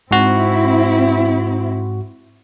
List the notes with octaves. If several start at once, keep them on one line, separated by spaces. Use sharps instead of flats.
G#2 C4 E4 F#4